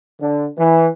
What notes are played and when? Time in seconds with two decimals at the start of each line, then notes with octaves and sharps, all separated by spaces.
0.20 D3
0.58 E3